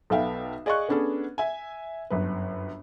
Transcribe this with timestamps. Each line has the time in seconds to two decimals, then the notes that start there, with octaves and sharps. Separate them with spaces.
0.10 B1 B3 A4 E5 F5 G5
0.66 G#4 D5 D#5 F5 C#6 F#6
0.89 B3 C#4 D4 G#4 A4
1.38 E5 G#5
2.10 G1 F#2 B4